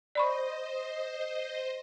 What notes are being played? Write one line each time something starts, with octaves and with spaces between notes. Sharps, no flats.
C5 D5 D#5 B5 C#6